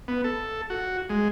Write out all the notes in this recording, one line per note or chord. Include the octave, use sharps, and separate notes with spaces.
B3
A4
F#4
G#3